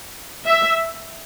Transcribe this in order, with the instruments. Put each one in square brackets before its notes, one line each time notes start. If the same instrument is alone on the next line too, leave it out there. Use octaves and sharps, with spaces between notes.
[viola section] E5